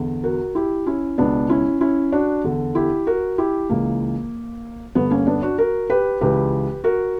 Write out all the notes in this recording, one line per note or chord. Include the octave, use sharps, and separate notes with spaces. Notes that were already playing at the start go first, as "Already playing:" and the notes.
Already playing: E2 D3
F#4 A#4
E4 G4
C#4 E4
C#2 B2 B3 D4
C#4 E4
C#4 E4
D4 F#4
E2 D3
E4 G4
F#4 A#4
E4 G4
C#2 C#3 E3 A#3
G2 D3 B3
A#3 C#4
B3 D4
D4 F#4
F#4 A#4
G4 B4
C#2 C#3 E3 G4 B4
F#4 A#4